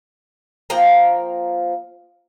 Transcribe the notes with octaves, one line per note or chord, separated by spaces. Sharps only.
F3 A#3 G5 A#5